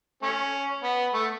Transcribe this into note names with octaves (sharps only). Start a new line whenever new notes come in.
A3 C#4
B3
A3